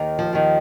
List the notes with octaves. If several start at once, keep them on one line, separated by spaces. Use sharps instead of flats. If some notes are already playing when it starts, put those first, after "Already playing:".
Already playing: D#2 D#3
F3
D#2 D#3